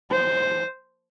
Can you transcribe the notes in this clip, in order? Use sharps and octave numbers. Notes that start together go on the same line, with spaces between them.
C5